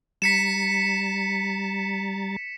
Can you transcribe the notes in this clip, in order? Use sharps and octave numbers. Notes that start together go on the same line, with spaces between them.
G3 A#5 A6 B6 C#7 E7